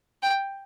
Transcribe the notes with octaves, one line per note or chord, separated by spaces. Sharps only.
G5